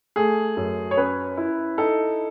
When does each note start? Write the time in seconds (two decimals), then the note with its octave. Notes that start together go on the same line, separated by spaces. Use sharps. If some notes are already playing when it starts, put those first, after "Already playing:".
0.16 A3 G#4
0.57 F#2
0.91 C#5
0.97 C#4 B4
1.37 E4
1.78 D#4 A4